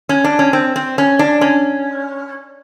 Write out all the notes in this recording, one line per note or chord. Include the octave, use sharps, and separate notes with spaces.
C#4
D4
C#4
C4
C4
C#4
D4
C#4